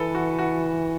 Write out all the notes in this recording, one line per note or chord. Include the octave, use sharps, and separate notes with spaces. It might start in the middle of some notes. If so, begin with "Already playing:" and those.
Already playing: E3 A4 B4
F#4
F#4